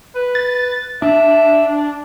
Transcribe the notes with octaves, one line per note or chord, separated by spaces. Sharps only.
B4
A6
D4 E5